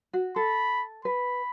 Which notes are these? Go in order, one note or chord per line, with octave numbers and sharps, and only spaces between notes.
F#4
A4 B5
B4 B5